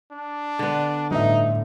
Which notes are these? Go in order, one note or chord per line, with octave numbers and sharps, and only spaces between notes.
D4
D3 B3
G1 A2 D#4 E5